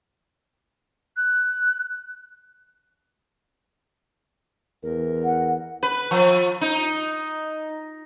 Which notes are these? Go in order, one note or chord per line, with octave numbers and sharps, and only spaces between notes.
F#6
E2 A#4
F#5
B4
F3
D#4